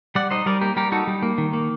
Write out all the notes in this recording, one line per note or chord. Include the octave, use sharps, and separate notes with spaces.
G3 D5 F#5
D#4 C5 D#5
G3 A#4 D5
A#3 G4 A#4
G3 G4 A#4
D#4 F#4 A4
G3
A#3
D#3
A#3